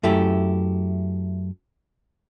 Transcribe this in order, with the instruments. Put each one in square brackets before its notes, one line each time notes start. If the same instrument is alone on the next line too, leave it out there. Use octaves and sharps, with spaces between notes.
[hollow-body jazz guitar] F#2 A3 E4 G4